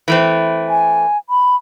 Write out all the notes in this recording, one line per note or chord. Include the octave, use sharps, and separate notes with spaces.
E3 A3 C4
G#5
B5